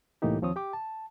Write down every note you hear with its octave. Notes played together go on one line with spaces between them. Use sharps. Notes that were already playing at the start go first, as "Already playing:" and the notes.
C2 A2 E3 A#3 D#4 G4
D#2 F3 C4 C#5 D#6
G4 G5 D6
A5